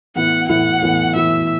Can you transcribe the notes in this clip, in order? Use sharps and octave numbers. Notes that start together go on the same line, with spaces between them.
A2 E3 B3 E4 F#5
A2 E3 B3 E4 F#5
A2 E3 B3 E4
A2 E3 B3 E4 E5